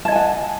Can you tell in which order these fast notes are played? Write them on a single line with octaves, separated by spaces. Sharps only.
A5 D#5 G#5 F#5